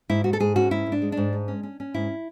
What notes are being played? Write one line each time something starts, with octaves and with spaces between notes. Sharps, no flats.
G#2 E4
G#2 F#4
A4
G#2 G#4
C#4 F#4
G#2 E4
G#2
D4
G#3
D4
G#2
G#3
C#4
C#4
C#4
G#2 E4